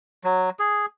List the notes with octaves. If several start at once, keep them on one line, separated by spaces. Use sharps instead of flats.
F#3
G#4